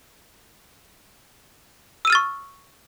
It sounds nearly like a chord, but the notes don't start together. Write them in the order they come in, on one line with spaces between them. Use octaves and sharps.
E6 D#7 F6 A6 C#6